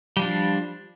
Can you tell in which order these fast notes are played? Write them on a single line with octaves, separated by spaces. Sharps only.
G3 F3 D4